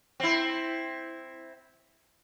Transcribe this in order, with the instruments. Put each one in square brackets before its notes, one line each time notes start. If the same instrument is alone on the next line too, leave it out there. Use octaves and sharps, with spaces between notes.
[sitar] C4 E4